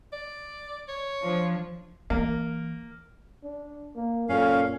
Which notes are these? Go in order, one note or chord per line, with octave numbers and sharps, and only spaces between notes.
D5
C#5
F3 D4
E3 A#3
D4
A#3
F#2 A#2 C#4 A4 F5